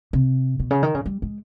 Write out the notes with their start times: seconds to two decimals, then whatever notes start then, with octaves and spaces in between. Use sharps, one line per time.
0.13 C3
0.60 B2
0.71 C#3
0.83 D#3
0.95 C#3
1.06 G3
1.22 G#3